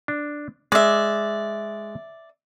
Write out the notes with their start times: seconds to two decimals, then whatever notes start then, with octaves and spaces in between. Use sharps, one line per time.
0.08 D4
0.72 G#3 D5 E5